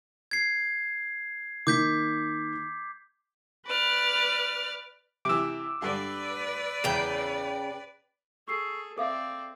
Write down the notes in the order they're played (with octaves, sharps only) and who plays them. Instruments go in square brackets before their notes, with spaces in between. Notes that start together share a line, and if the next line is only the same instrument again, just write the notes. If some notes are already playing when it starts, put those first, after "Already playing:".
[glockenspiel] G#6 C7
[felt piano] D#3 A#3 [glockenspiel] D6 G6 B6
[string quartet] B4 D5 F6
[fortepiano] C3 E3 [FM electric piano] D6 E6
[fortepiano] G2 D3 [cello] B4 D5
[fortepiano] E2 [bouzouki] C#3 G5
[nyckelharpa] G#4 A4 [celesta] C#6 E6 C7
[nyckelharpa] C4 D5 [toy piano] A4 E5 F5 [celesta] D6